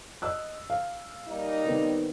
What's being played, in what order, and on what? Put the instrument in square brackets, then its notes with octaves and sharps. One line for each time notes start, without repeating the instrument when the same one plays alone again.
[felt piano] D#5 E6 F#6
F5
[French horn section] G3 A#3 D#4
[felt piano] D#3 B3 C4